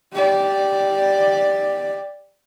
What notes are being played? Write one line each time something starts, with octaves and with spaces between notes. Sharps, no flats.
G4 D5